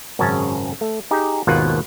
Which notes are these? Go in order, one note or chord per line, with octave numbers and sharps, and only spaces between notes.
G#1 F#2 C#3 C#4 A5
A3
D#4 G4 G#4
G#1 D#2 B2 A#3 F4 F#5